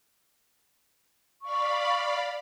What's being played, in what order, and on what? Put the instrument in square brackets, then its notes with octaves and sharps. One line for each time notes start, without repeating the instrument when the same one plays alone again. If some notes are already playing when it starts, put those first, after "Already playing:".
[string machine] D5 F5 B5 [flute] C#6